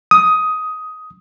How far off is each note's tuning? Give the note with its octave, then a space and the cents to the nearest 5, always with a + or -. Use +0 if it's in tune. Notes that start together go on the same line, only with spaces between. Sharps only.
D#6 +10